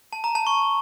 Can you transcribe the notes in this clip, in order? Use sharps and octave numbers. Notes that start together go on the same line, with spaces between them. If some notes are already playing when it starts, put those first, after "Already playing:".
A5
A#5
A5
C#6